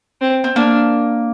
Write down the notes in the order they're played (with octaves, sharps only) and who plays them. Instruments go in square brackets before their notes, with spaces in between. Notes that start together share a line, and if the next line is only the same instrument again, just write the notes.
[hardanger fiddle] C4
[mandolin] C4
[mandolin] A#3 [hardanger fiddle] D4